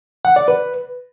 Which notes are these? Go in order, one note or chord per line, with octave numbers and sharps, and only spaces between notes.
F#5
D5
B4